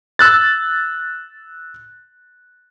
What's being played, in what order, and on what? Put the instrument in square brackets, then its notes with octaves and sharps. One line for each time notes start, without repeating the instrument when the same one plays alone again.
[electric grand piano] E6 F#6 A6